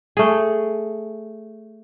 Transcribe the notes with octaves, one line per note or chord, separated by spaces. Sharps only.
A3 G#4